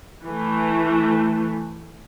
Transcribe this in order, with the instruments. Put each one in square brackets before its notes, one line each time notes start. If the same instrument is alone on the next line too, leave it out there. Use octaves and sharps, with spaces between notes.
[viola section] E3 A3